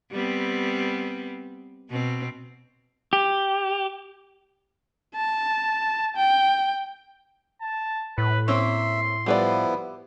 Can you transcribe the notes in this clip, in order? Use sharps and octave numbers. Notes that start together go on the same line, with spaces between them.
G3 B3 C4
B2 C4
G4
A5
G5
A5
A2 B4
A#3 C4 C#4 E5 C6
F3 G3 B3 E4 B4 D5